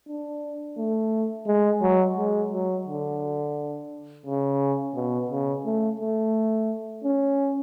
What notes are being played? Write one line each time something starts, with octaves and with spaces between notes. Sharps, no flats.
D4
A3
G#3
F#3
G#3
F#3
D3
C#3
B2
C#3
A3
A3
C#4